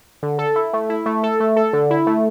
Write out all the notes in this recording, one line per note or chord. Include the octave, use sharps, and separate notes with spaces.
D3
A4
E4
A3
E4
A3
A4
A3
A4
D3
E4
A3